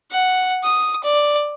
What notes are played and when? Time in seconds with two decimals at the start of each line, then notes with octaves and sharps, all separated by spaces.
0.11 F#5
0.64 D#6
1.04 D5